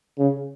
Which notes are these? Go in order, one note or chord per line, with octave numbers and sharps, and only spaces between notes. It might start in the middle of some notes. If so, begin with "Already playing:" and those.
C#3